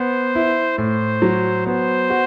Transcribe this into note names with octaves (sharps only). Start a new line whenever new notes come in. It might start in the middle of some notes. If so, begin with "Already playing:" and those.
Already playing: B3 C5
E4
A2 C5
F#3
B3 C5
F#4